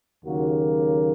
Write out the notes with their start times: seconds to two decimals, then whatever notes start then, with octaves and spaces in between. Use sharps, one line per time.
0.24 D#2 C#3 F#3 A#3 F#4